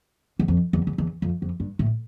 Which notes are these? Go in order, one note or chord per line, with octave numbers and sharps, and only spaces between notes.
E2
F2
E2
E2
E2
F2
F2
G2
A2